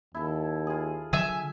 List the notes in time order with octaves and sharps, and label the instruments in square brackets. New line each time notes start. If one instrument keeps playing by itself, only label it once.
[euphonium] D#2 [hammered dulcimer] E4 A4
[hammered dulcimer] F4 G#4
[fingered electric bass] D3 F#3 [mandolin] E5 G#5